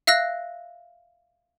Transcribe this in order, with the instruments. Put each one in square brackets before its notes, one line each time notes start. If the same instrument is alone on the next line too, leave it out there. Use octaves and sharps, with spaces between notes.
[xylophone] E5 F5 E6 F#6 A#6